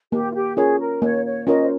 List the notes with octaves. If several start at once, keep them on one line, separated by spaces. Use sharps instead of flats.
A#3 G4
F4
G4
C#4 F4 G#4 A#4 C#5
A#4
A#3 C#5
C#5
C#4 F4 A#4 C#5 D#5
C5